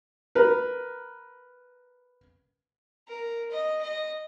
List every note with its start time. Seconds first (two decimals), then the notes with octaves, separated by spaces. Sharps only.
0.35 A#4 B4
3.08 A#4
3.51 D#5
3.82 D#5